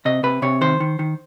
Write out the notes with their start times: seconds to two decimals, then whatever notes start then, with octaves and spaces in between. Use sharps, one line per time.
0.05 C3 D#5
0.23 C3 B4
0.42 C3 C#5
0.61 D#3 C5
0.80 D#3
0.99 D#3